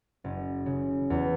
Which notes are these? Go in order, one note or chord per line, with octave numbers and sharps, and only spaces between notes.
F#1
C#3
E2